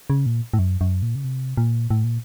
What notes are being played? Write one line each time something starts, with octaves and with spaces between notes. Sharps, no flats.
C#3
A#2
A2
F#2
F#2
A#2
C#3
C3
A#2
A2
A#2